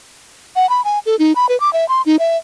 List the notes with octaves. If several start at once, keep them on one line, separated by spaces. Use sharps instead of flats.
F#5
B5
G#5
A4
D#4
B5
B4
D6
E5
C6
D#4
E5